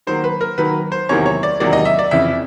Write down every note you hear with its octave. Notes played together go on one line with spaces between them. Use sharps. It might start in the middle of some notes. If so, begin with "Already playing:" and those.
D#3 F#3 A#3 C5
B4
A#4
D#3 F#3 A#3 B4
C5
E2 C3 D#3 F#3 A#3 C#5
C#5
D5
E2 C3 D#3 F#3 A#3 D5
D#5
E5
D5
F2 C#3 E3 E5